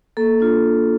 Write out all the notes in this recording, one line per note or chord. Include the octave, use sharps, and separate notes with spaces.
A#3 A4
D4 F4